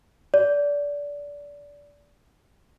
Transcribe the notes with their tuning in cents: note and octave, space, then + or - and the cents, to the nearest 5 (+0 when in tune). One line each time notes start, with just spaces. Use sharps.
D5 -20